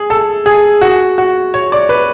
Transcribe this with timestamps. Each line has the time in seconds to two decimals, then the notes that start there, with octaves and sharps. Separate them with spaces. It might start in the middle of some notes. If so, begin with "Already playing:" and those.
Already playing: G#4
0.10 A4
0.46 G#4
0.81 F#4
1.18 F#4
1.54 C#5
1.72 D5
1.89 B4